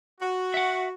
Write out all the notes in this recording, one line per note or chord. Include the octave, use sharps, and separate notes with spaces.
F#4
E5 F#5